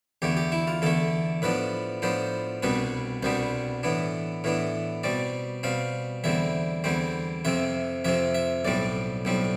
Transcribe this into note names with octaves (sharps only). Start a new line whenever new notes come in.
E2 D3 A3 G4
G4
E4
F4
E2 D3 A3 A4
A2 F3 B3 D4 B4
A2 F3 B3 D4 C5
C2 B2 G3 B3 D4 B4
C2 B2 G3 B3 D4 C5
A2 E3 B3 D4
A2 E3 B3 D4
B2 G3 C4 D5
B2 G3 C4 F5
E2 D3 G3 C4 E5
E2 D3 G3 C4 C5
F2 C3 F3 C4 E5
F2 C3 F3 C4 E5
E5
B1 A2 G3 C4 D5
B1 A2 G3 C4